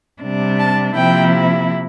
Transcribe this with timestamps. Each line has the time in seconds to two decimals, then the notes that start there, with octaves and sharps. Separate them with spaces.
0.21 C3 G3 D4
0.59 A5
0.95 C3 F3 A#3 E4 G5